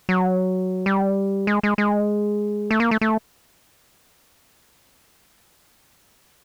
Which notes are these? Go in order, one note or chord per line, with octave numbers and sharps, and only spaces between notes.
F#3
G3
G#3
G#3
G#3
A3
A#3
A3
A3